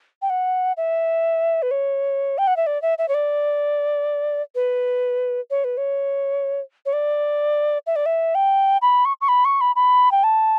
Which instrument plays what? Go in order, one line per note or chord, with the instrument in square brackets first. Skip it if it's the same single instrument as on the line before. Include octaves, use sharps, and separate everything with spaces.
[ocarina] G5
F#5
E5
B4
C#5
G5
F#5
E5
D5
E5
E5
C#5
D5
B4
C#5
B4
C#5
C#5
D5
E5
D5
E5
G5
B5
C#6
C#6
B5
C#6
B5
B5
G5
A5